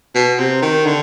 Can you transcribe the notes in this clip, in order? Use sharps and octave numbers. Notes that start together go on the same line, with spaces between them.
B2
C3
D#3
D3